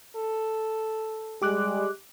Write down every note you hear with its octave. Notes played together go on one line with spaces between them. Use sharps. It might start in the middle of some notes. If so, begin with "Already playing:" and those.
A4
G3 G#3 G4 D6 F#6